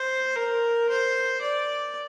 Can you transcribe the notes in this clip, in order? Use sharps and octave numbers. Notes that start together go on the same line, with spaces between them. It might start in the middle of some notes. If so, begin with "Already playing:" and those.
Already playing: C5
A#4
C5
D5